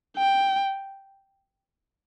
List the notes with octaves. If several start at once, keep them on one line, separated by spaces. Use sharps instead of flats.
G5